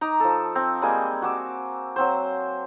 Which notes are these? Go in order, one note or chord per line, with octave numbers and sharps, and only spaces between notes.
D#4 A#5 D6
F3 A4
C4
G3 G#3 A#3 G#5
F#4 D6 E6
F#3 C4 C5